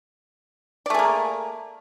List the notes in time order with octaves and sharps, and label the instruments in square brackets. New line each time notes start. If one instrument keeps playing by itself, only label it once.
[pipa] D5
A3
G#4
A#3